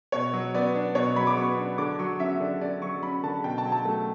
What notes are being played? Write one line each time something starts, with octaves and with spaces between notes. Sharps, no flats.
B2 C#5
F#3
B3 D5
D4
B2 C#5
F#3 B5
D6
B3 C#6
D4
D3 D6
F#3 C#6
C#4 E5
D3 D5
D3 D5
F#3 C#6
C#4 B5
D3 A5
B2 G5
A5
F#3
A5
A3